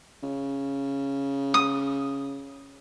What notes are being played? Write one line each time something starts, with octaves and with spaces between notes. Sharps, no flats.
C#3
D#6